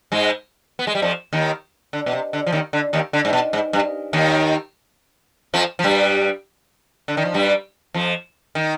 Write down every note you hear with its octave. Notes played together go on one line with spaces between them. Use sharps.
G#2 G#3
B3
G#3
G3
F2 F3
D#2 D#3
D3
B2
C3
D3
F3
D#2 D#3
D3
D#2 D#3
D3
G#2
B2
G#2
G2
D#2 D#3
F2 F3
F3
G2 G3
D3
D#3
F3
G2 G3
F2 F3
D#3